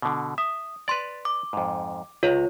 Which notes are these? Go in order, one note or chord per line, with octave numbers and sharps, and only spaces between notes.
B2 D3
E5 D#6
B4 D5 C6 A6
D6
F2 G#2
C#2 F4 C#5 A#5